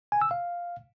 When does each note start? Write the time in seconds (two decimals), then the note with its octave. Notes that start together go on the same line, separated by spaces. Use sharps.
0.12 G#5
0.22 E6
0.31 F5